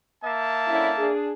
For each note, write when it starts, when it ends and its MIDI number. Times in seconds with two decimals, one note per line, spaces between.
0.24 1.11 58
0.24 1.11 76
0.24 1.11 81
0.68 0.89 50
0.68 0.89 61
0.68 0.89 64
0.97 1.31 62
0.97 1.31 68